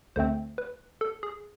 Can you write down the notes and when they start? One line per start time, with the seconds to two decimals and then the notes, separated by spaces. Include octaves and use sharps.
0.16 D2 D3 A3 C4 C5
0.58 B4
1.01 A4
1.23 G#4